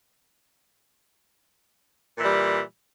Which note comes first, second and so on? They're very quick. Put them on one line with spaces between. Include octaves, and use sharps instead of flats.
A#2 E3 G3